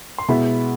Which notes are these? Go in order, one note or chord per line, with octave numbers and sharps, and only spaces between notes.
C6
B2 G#3 B3 E4 B5